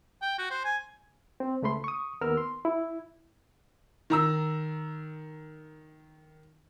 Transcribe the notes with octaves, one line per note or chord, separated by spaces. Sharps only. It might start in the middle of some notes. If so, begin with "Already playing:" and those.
G5
F#4
C5
G#5
C4
C#2 A3 B5 C6
C#6 D#6
D#2 B3 A#4 E6 F6
C6
E4
D#3 A#5 E6